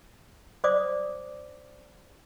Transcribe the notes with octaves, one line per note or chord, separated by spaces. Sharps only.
C5 D5 D6 D#6